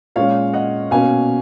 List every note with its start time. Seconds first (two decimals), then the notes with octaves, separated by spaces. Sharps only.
0.16 A#2 G#3 C#4 C#5 F5
0.53 D#5 F#5
0.91 B2 A#3 C#4 F5 G#5